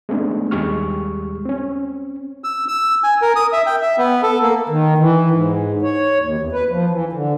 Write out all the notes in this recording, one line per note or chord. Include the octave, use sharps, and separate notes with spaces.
G#3 A3 B3 C4 D4 D#4
D#2 G3 G#3 G4 C#6 F6
C4 C#4
E6
E6
G#5
A#4
D#6
E5
G5
E5
B3
A4
A#3
D#3
E3
G#2
C#5
D#2
E2
B4
F3
E3
D3